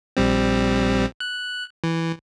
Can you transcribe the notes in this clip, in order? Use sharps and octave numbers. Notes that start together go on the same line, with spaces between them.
A#1 G3 C4
F#6
E3